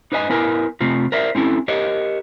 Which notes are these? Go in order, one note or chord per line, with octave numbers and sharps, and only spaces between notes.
D#4 B4 C5 D#5 G#5
B3 E4 A#4 B4 G#5
C3 A3 C4 F4
A#4 C5 D5 E5
C4 C#4 E4 A4
G4 A#4 C5 C#5 D#5